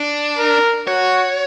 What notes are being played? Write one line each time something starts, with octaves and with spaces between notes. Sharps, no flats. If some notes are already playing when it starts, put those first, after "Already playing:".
Already playing: D4
A#4
F#4 C#5